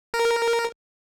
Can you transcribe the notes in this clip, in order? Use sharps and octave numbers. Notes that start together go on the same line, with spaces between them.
A#4